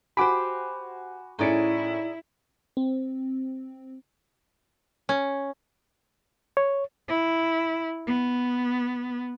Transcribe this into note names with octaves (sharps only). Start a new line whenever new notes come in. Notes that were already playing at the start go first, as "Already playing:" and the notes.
F#4 G4 C5 G#5 B5 D6
A2 C#4 D#4 E4 G#4 D5 C#7
C4
C#4
C#5
E4
B3